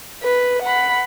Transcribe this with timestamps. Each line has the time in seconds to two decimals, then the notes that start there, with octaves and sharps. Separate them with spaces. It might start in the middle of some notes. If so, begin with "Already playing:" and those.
0.23 B4
0.63 F#5 B5